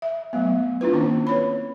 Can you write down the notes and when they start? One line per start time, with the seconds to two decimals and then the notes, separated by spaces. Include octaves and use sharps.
0.02 E5
0.33 F#3 A3 B3
0.81 D4 E4 F4 B4
0.93 D#3 A#3 C4 C#4 E4
1.27 B4 C#5 B5